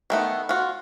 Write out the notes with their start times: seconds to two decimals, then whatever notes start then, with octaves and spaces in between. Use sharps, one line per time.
0.10 D#3 A3 B3
0.49 F4 F#4